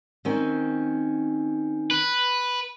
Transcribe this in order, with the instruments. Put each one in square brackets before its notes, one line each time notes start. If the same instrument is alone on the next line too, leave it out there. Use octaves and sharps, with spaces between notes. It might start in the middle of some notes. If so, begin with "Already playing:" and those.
[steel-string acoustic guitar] D#3 C4 C#4
[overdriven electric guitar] B4